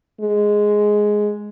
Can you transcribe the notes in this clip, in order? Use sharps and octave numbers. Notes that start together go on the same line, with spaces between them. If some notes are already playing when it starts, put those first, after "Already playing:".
G#3